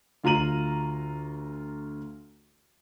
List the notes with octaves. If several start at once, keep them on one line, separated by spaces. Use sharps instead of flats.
D2 F4 A#5 D#7 F#7